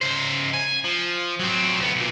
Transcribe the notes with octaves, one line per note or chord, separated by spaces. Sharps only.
C#3 C5
G#5
F3
F#3 C4
D2 B3
B1 A#2